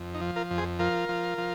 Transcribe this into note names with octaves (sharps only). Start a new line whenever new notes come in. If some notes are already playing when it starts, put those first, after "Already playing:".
Already playing: F2
D#4
F3
F4 A#4
F2
G#4 C5
F3 F4 A#4
F3
F3